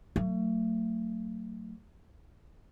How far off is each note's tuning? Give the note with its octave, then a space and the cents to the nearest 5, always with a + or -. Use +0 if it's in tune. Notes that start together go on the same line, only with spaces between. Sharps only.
F#3 +5 A3 +40